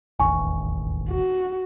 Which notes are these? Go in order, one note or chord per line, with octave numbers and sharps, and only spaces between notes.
E1 A1 D#2 G#5 C#6
F#4